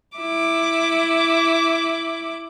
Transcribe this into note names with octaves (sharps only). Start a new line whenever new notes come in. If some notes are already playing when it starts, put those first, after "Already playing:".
E4 D6